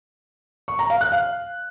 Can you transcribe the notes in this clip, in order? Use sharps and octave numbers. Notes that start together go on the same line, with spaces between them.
C#6
A#5
F5
F#6
F5